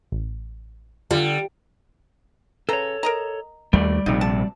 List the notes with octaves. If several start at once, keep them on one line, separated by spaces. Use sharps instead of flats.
A1
D3 G3 F4
C#3 A4 B4 C#5 A#5
A#4 D#5 A#5
D#2 G3 A3 D5
A#1 C3 D#4
A5